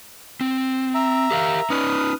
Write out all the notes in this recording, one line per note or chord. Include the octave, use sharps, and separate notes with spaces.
C4
E5 A#5
G4 A#4 F5
C#4 D#4 B4 D#6 F6